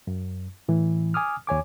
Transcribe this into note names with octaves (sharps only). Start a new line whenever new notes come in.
F#2
A2 E3
G#5 D6 D#6 F6
D#2 C#5 G#5 D6